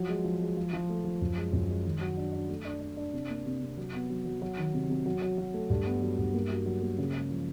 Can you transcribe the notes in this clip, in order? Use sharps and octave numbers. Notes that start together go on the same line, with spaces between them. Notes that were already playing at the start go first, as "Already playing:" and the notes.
Already playing: F3 F#3
G#3
F3
G#3
F3
F3
A3
F3
F#2
G#3
F#2
G#3
D#3
F#3
D4
D4
A3
D4
D4
D4
C3
A#3
C3
C3
F#3
B3
F#3
F#3
F#3
D#3
C3
C3
F#3
F#3
F#3
A3
G2
B3
F#3
G2
A#3
F#4
F#3
A#3
C#3
G#3
F3